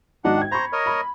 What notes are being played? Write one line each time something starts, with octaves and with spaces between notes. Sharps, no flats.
G#1 D4 D#4 F#4 F#5
G5 G#6
C5 A#5 B5 C#6
A#4 C#5 D#5
B5